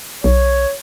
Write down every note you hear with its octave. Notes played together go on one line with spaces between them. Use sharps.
B1 C#5